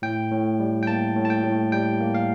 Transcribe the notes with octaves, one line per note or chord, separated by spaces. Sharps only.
A2 G5
A2
G3
G5
A#3 A5
A2
A5
G5
A2
G3 G5
A#3
F5